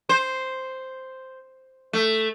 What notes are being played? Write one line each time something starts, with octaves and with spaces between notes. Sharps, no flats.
C5
A3